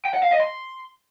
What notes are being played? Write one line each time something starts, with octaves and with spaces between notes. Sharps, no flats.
G5
F#5
F5
D#5
C6